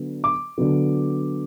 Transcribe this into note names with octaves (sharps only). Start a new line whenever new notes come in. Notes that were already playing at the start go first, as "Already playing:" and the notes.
Already playing: D3 F#3 B3
D6
D3 F#3 B3